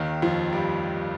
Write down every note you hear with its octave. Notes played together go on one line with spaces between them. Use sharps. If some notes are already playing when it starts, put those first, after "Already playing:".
Already playing: D#2 D#3
F2 F3
G2 G3